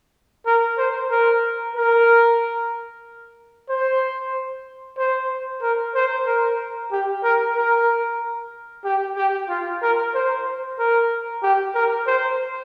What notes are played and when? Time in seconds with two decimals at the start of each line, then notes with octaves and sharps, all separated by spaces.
0.46 A#4
0.78 C5
1.10 A#4
1.76 A#4
3.69 C5
4.98 C5
5.62 A#4
5.95 C5
6.26 A#4
6.91 G4
7.23 A#4
7.56 A#4
8.84 G4
9.16 G4
9.49 F4
9.82 A#4
10.14 C5
10.79 A#4
11.43 G4
11.75 A#4
12.07 C5